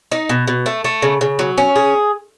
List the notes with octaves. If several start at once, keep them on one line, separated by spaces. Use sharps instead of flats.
D#4
B2
B2
A3
A3
C#3
C#3
F#3
C#4
G#4